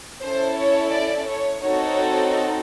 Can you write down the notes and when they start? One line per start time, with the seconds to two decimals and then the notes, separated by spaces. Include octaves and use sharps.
0.23 C#4 E4 A4 C5
0.58 C#5
0.94 D5
1.30 C#5
1.65 C4 D#4 F#4 A4 C#5